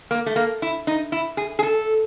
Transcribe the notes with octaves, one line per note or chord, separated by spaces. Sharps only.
A#3
A3
A#3
E4
D#4
E4
G#4
G#4
A4